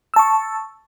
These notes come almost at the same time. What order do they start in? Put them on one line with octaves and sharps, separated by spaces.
E6 A5 C#6